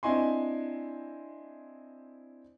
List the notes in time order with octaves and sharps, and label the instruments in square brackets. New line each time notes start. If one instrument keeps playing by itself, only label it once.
[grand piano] C4 D4 E4 D#5 G#5 C6